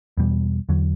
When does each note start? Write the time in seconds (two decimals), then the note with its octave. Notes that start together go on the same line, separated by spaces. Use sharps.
0.17 E2 B2 G3
0.69 E2 D3 F#3